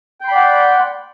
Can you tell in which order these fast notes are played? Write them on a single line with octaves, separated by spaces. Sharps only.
G5 C6 B5 D5 F#5